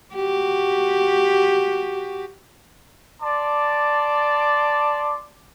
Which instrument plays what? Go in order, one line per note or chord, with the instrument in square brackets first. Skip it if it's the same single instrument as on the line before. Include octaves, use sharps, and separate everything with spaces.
[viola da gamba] F#4 G4
[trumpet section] D5 A5 C6 D6